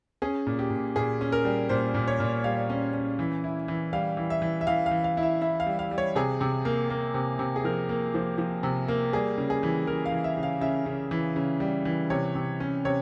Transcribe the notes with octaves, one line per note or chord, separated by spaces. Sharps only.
C#4 G#4
A#2
G4
A#2
A#2 G#4
C#4
A#4
G3
A#2 C5
A#2
C#5
A#2
G3 F5
C#4
C#4
E3
E4
E3
G3 F5
E3
E5
E3
E5
E3 F5
F5
E3
F5
E4
E5
E4 E5
F5
G3
F5
G3
C#5
C3 G#4
C3
A#3
A#3
C3
C3
G#4
F3 A#4
A#3
F3
F3
C3
A#3
G3 G#4
C#3
G#4
E3
E3 A#4
F5
E3
E5
C#3
F5
C#3 E5
C#3
E3
C#3
G3
E3
C3 C#5
C3
C#4
C3 C#5